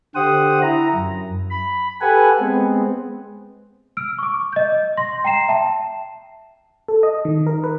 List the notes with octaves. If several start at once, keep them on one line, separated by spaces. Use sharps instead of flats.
D3 G4 C5 F#5 D#6
E4 A#5
F#2
B5
G4 A4 B4 F#5 G#5
G#3 B3 C4
E6 F6 D7
C#6 D6
D#5 G6
C6 A#6
G5 A#5 C7 E7
E5 G5 A5
A4
D#5
D#3
A#4
B4